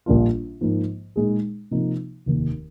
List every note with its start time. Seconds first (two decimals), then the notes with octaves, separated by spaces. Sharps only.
0.06 A#1 A#2 G3 D4 F4
0.61 G#2 F3 A#3
1.16 A#2 G#3 D#4 G#4
1.71 C3 F3 A#3 D#4
2.26 F1 D#2 D#3